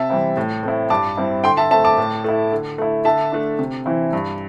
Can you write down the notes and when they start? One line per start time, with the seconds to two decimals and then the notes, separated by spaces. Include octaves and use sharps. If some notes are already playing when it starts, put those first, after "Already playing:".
Already playing: C3 E5 A5
0.10 E3 G3 C4 E4
0.37 A2
0.63 A3 C4 E4
0.90 G2 A5 D6
1.17 G3 C4 E4
1.44 D3 G5 C6
1.57 E5 A5
1.71 A3 C4 E5 A5
1.85 A5 D6
1.98 A2
2.24 A3 E4
2.52 D3
2.78 A3 E4
3.05 D3 E5 A5
3.32 A3 D4
3.59 C3
3.86 E3 C4 E4
4.13 G2